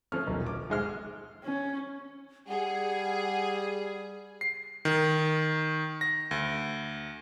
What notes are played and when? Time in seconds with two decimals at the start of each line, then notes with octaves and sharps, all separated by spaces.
0.12 F3 A3 C#4 F6
0.27 D#1 B1
0.46 D6
0.70 G#2 G#3 F6
1.44 C#4
2.48 G3 G#4 F#5
4.41 C7
4.85 D#3
6.01 A#6
6.31 D2